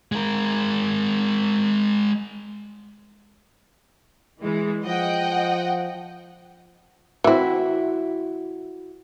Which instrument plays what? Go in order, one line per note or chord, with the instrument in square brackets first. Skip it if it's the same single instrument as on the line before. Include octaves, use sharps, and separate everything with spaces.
[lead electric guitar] G#3 A#4
[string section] E3 G#3
[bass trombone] F3 [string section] D#5 F#5 G5
[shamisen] E3 C4 [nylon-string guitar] E4 F#4